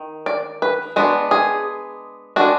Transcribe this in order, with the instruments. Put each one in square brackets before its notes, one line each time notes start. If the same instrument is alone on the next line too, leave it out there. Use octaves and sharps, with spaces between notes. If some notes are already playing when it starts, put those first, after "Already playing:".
Already playing: [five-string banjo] D#3
D5
B4
G#3 B3 D4 F#4
G#4
G#3 D4 F#4